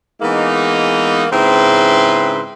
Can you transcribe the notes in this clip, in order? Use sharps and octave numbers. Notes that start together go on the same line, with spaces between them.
E3 G#3 A#3 B3 D#4
G#2 C#3 C4 E4 B4 C6